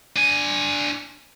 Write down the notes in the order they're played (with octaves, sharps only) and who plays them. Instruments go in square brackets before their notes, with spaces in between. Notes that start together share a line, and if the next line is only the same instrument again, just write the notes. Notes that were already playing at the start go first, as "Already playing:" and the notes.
[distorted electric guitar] D4 G#5